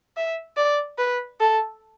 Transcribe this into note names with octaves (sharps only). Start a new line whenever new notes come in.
E5
D5
B4
A4